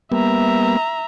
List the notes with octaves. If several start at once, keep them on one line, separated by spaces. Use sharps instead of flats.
G3 A#3 B3 E5 A#5